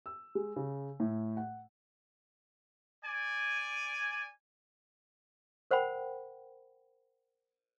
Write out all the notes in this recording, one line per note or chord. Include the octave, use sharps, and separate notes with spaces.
E6
G#3
C#3
A2
F#5
D5 G#5
A#4 C5 F#5 G5 B5